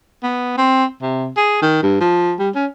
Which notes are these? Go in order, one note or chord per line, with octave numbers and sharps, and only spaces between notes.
B3
C4
C3
G#4
D#3
G2
F3
G3
C#4